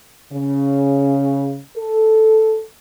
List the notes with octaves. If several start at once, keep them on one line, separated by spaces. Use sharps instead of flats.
C#3
A4